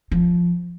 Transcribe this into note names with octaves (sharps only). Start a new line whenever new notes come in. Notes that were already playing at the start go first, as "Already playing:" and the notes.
F3